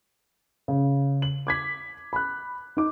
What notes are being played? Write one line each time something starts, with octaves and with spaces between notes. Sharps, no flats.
C#3
F#7
D6 G#6 B6
B5 F#6
D#4 D6